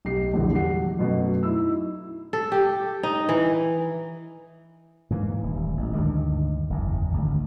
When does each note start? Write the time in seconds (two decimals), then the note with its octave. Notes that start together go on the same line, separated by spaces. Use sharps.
0.05 B1 G4 C7
0.33 A#1 E2 G2 D3 E3
0.53 F#3 G4 F#5 C7
0.99 F#2 B2 A3
1.43 D#4 E4 E6
2.33 A4
2.52 G4
3.03 D#4
3.29 E3
5.10 G#2 E3 A#3
5.43 D#1
5.77 A1
5.94 D2 G2 D#3 G#3
6.70 F#1 E2
7.11 G#1 D2